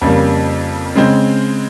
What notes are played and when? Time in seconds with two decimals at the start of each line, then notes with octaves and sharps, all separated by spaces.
0.01 F2 C#3 G3 A#3
0.95 C#3 G#3 C4